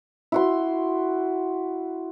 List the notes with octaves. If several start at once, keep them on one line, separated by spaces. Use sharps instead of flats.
E4 F#4 C6